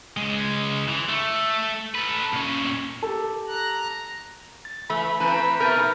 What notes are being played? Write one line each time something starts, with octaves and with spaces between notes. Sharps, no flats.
C#2 G#3
E3
A3
A4 B4
A#2 C#4
G4 A4
A#5 F#6
A6
E3 A3 B5
E3 A3 C4 B4 A#5
A#2 A3 D#4 A#4 B4 F6 G6 A6